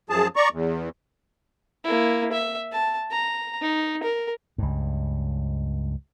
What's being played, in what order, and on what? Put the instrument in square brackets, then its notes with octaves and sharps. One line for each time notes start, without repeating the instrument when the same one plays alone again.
[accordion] F#2 F3 G#4 A5
D5 A#5 C#6
E2
[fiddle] A#3 E4
E5
A5
A#5
D#4
A#4
[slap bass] C#2 G2